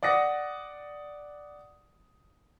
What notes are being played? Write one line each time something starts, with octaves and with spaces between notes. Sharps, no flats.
D5 F#5 D#6 A#6